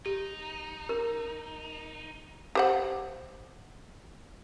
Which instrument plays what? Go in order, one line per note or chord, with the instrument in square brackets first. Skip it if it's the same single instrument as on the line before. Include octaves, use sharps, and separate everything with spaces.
[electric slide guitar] D#4 [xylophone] G4
[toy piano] A#4
[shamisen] G4 C5 F#5